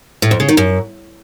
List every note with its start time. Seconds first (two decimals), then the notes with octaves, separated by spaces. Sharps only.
0.22 A2
0.31 F2
0.40 C#3
0.49 D#3
0.57 F#2